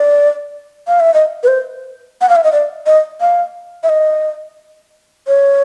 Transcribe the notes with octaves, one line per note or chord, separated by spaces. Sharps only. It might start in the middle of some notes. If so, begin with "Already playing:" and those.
Already playing: D5
F5
E5
D#5
B4
C5
F#5
F5
E5
D#5
D5
D#5
F5
E5
D#5
C#5